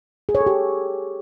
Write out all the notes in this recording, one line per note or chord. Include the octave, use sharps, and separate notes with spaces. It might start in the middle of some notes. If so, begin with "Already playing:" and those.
G#4
C#5
A4
G4